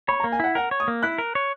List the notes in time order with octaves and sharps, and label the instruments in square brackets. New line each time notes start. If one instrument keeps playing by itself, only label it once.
[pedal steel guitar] C#5 [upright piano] B5
[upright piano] A#5
[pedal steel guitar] A#3
[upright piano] G#5
[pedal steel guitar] E4 [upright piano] F#5
[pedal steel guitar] A#4 [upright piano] F#5
[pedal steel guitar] C#5
[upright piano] D#6
[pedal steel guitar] A#3
[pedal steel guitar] E4 [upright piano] F#6
[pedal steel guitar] A#4
C#5